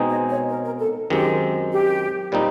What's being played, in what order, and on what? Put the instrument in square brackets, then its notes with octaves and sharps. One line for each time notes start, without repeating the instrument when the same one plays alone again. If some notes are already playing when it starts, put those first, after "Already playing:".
Already playing: [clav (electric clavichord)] B2 G#3 C4 D#4 G#4
[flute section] C#5 D#5
C#5 D#5
A#4
A#4
A4
[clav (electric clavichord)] F#2 D#3 G#3 C4 [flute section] G4
[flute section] G4
[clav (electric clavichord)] A#2 G3 C4 D#4